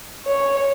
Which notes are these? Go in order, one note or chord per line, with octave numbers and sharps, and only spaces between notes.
C#5